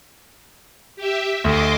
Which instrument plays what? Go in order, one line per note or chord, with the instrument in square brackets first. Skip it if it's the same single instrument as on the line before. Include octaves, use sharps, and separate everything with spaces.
[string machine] G4 E5
[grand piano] D2 [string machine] D#5 C6 D6